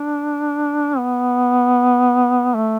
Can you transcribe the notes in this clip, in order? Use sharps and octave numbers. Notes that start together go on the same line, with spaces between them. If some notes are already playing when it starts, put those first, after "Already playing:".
Already playing: D4
B3
A3